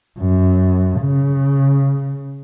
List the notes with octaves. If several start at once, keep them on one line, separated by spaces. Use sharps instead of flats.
F#2
C#3